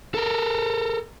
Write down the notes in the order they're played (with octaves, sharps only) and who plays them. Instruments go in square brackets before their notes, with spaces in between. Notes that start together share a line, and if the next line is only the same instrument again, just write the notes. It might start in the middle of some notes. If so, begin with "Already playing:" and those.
[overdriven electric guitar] A4 A#4